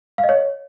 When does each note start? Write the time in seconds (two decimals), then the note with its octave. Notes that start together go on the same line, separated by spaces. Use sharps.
0.18 F5
0.24 D#5
0.29 C#5